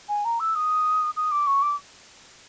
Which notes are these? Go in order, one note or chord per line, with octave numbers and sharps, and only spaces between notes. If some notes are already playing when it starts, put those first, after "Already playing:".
G#5
A#5
E6
D#6
D#6
D6
C#6
D6